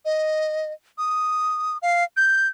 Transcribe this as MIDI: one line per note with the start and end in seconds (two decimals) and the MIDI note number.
0.05 0.72 75
0.98 1.78 87
1.82 2.04 77
2.17 2.48 91